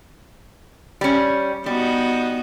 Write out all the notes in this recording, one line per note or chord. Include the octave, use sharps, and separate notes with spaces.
G3 C#4
G3 B3 D#4 F#4